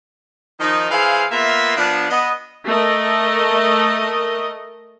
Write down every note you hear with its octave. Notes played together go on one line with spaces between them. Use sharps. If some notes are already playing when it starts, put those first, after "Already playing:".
D#3 F3 D#4
E3 G#4 C5 F5
A#3 B3 F4 E5
F3 B3 D4
B3 D#5
A3 A#4 D#5